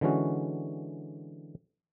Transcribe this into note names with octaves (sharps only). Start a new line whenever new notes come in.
D3 E3 G#3 C#4 F#4